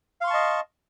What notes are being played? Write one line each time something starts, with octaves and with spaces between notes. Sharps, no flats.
D#5 F5 A5 C6 C#6